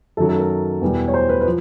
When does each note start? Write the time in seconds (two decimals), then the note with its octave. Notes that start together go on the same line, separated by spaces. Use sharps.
0.17 F#2 D#3 F#3 A4
0.29 A4
0.39 A#4
0.82 E2 B2 G3
1.08 C#5
1.14 C5
1.29 B4
1.41 B4
1.45 F3